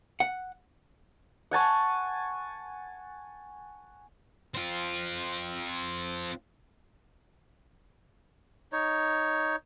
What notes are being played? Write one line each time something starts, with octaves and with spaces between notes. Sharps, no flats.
F#5
F#5 G#5 A5 C#6
C4 F4
D#4 C#5